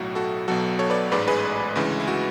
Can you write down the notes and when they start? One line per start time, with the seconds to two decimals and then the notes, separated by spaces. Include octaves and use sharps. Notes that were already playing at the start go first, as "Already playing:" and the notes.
Already playing: B1 A2 F#3 F#4
0.15 F#4 A4
0.48 B1 B2 F#3 F#4 A4
0.79 A4 C#5
0.90 B4 D5
1.11 A1 G#2 G#3 B4 D5
1.28 G#4 B4
1.76 D2 C#3 E3 G#3
2.00 E4
2.08 F#4